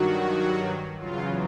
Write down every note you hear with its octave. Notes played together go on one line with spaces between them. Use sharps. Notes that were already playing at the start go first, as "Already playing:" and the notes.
Already playing: G2 D#3 F#3 F#4
E2 C#3 F#3 F4